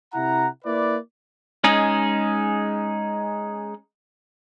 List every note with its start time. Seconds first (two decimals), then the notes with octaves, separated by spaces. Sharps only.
0.14 C3 E4 F#5 A#5
0.64 A#3 E4 B4 D5
1.64 G#3 C#4 D#4 G#4